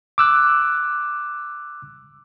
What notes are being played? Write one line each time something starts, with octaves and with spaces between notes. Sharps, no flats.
D6 E6 F#6